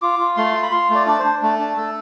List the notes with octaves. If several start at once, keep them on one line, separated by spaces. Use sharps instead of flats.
F4 D6
F4
A3 C6
F4
B5
F4 C6
A3 D5
D4 D5
C5
D4
A3
D4
A3 A4